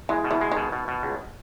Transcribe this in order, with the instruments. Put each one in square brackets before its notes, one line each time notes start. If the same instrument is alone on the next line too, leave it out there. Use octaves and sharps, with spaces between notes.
[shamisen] E3 [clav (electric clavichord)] G#3
[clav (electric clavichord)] B2
[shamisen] E3
[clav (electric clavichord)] G#3
[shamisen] D#3
[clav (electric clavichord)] B2
B2
B2
C#2